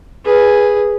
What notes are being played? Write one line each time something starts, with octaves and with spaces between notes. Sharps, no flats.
G#4 B4